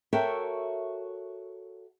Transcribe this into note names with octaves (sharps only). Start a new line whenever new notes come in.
F#4 A4 A#4 C#5 E5 G5